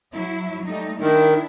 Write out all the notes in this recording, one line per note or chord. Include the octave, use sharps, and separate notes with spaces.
F#3 E4
G3 A3 D#4
D#3 D4 E4